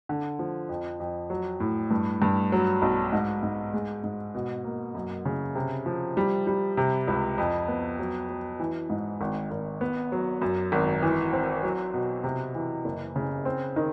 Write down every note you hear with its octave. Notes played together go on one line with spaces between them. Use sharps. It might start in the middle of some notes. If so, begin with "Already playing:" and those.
D3
F3
F2
F2
F#3
A2
G2
G2
F#3
B1
G#2
G#2
G#3
G#2
B2
A#3
F#2
C#3
C3
F3
G3
G3
C3
C#2
F2
B3
F#3
F#3
E3
G#2
G#1
G#1
B3
F#3
F#2
G#1
E3
C4
F#3
B2
C3
E3
F#1
C#3
C4
D#3